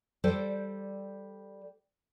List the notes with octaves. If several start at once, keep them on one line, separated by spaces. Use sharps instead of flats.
G3 A4 C5 D5